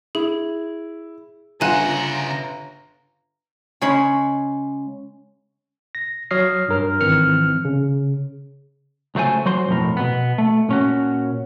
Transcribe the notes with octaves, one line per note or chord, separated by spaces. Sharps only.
E4 G#4
G1 C#3 F4 F#5 G#5 A#5 F#6 E7
C#3 G#3 C#5 B5
A#6
F#3 C#5 D#6 F6 A#6 C7
G2 A#4 F6
G#1 E3 C4 F6 C#7
C#3
C#2 F#3 A3 C5 G#5
F#3 F#4 C5 C6
B1 F2 A2 A#4
B2 B3
A3
A#2 C#4 F#4